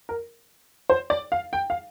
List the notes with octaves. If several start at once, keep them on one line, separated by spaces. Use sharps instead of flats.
A#4
C5
D5
F5
G5
F5